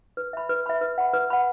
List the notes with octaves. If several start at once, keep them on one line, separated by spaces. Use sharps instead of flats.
B4
E5 B5
B4
E5 B5
B4
F#5 B5
B4
F#5 B5